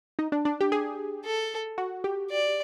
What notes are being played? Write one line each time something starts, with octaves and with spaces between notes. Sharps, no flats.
D#4
D4
D4
G4
G#4
A4
F#4
G4
D5